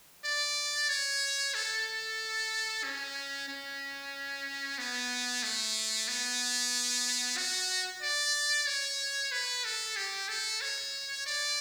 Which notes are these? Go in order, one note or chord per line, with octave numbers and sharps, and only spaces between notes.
D5
C#5
A4
C#4
C#4
B3
A3
B3
F#4
D5
C#5
B4
A4
G4
A4
C#5
D5